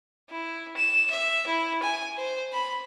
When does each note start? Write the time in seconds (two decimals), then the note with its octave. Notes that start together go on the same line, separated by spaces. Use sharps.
0.30 E4
0.77 E7
1.10 E5
1.47 E4
1.82 G#5
2.18 C5
2.53 B5